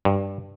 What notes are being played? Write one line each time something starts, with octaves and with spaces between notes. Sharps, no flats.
G2